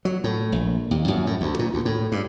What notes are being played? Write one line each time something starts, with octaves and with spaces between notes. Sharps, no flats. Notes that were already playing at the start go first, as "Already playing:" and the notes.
F#3
A2
A#1
D#2
F#2
A2
D2
A#2
D2
A2
G2